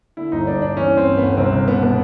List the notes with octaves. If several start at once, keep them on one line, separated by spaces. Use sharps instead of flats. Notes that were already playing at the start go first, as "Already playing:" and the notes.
D3 E4
G1 D#4
G2 D4
G1 D4
E3 C#4
G1
C4
G2
G1 B3
C2 C4
C2
B2 B3
B2